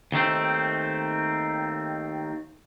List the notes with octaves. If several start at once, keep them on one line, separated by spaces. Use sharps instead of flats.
D#2 D#3 A3 C4